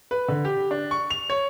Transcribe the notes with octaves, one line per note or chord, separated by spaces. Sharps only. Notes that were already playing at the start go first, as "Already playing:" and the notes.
B4
D3
G4
D4
C#6
F7
C#5